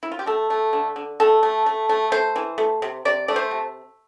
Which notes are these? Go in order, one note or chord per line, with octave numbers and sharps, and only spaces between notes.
E4
F4
G4
A3 A4
A3
D3
D3
A3 A4
A3
A3
A3
A3 C5
E3
A3
C3
C3 D5
A3 D5
C5
C3